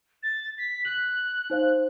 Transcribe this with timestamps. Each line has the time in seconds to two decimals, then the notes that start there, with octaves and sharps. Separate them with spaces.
0.23 A6
0.58 B6
0.85 F#6 F#7
1.50 D#4 C5 F5